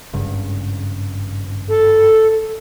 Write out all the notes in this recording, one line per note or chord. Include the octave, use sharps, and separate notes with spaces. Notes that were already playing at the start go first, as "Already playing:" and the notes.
G#1 G2 C#3
A4